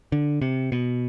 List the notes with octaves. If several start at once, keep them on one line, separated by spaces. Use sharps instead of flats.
D3
C3
B2